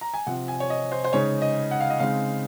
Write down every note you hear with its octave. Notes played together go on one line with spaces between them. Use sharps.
A#5
G#5
C3 F3 C4 F#5
G#5
C#5
D#5
C5
C5
C#3 G#3 D#4 C#5
D#5
F#5
F5
D#5
C#3 G#3 C4 D#4 F5